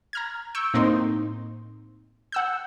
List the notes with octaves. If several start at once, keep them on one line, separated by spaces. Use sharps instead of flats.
A#5 F6 G#6
C#6 E6 G6 D7
A2 A#3 C4 D#4 C6
F#5 E6 G6